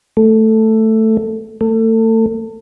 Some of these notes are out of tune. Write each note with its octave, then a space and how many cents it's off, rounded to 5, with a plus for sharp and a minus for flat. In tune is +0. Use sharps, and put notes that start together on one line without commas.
A3 +5
A3 +30